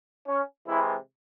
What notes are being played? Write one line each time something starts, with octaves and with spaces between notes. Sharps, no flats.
C#4
C3 E3 G#3 E4